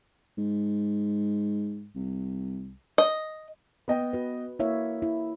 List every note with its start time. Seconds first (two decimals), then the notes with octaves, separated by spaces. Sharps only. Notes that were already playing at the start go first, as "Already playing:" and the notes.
0.38 G#2
1.95 C2
2.98 D#5
3.88 B3 D#5 G5
4.13 F#4 B4
4.59 A#3 E4 C#5 E5
5.02 E4